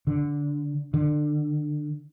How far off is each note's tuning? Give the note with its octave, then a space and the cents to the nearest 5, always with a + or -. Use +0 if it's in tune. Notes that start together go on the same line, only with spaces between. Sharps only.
D3 -10
D3 +25